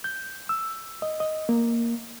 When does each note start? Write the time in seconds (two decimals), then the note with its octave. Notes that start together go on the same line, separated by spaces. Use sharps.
0.04 G6
0.49 E6
1.02 D#5
1.20 D#5
1.49 A#3